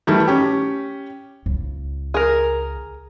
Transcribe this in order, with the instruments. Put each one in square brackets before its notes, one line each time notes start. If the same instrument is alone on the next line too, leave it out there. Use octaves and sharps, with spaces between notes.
[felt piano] D#3 E3 G3 A3 E4
C#4 G4
[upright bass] C#2
[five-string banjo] G#4 A#4